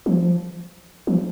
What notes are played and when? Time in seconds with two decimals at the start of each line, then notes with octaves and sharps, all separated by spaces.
0.06 F3
1.07 F3